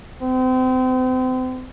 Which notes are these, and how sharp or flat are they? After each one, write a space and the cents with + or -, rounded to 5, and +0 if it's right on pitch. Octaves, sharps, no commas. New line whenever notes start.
C4 -35